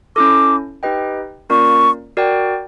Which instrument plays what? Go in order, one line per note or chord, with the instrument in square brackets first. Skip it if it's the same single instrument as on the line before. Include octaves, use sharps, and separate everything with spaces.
[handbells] C#4 E4 A4 [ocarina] D6
[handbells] D#4 G4 B4 D#5 G5
[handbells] A#3 C#4 F4 A#4 D5 [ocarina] C#6
[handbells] F#4 A#4 D5 G5